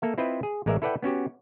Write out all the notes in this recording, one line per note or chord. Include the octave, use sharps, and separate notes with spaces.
A#3 A4 E5
C4 E4 F4 B4 C5 D#5
G#4
A1 G#3 A#4 D5 E5 F5
E4 A4 B4 D5 F#5 G5
B3 C#4 F#4 G4